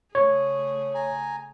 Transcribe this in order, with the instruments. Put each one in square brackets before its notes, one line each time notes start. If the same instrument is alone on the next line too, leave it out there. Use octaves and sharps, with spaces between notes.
[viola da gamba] C#3 A3 G#4 [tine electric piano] C#5
[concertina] G#5 A#5